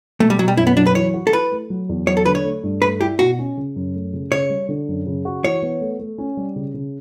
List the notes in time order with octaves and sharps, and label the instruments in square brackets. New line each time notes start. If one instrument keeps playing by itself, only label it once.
[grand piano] B2 [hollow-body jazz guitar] A3
[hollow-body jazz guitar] G3
[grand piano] B2 [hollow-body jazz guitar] F#3
[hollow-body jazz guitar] G3
[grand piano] F#2 [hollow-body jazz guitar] E4
[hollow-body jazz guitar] B3
[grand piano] F#3 [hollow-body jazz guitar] D4
[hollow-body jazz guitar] B4
[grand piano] E3 [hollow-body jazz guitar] C#5
[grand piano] F#4
[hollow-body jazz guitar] A4
[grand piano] E4 [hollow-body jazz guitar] B4
[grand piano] A3
F#3
E2
[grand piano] F#3 [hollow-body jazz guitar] C#5
[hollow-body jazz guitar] A4
[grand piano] D3 [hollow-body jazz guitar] B4
[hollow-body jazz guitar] C#5
[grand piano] A3
G2
[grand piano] A3 [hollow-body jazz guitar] B4
[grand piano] E4 [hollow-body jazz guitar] G4
[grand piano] B2 [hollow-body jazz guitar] F#4
[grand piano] C#4
C#3
F#2
A3
C#3
[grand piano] C#3 [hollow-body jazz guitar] C#5
[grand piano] G3
D3
F#2
C#3
F#4
[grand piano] E3 [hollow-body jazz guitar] C#5
[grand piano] B3
A3
A3
C#4
G3
C#3
C#3